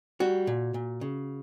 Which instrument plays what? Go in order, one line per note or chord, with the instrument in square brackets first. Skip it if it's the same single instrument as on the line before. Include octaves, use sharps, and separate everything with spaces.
[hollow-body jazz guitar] G3 F#4
A#2
A#2
C#3